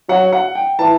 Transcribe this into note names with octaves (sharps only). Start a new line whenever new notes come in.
F#3 F#5
F#5
G5
E3 A5